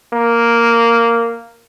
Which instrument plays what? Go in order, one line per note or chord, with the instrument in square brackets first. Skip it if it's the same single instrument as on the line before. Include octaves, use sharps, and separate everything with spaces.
[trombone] A#3